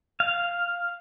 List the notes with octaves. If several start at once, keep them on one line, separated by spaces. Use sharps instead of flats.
F5